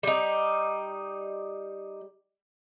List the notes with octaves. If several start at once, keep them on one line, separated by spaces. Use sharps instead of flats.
G3 D#4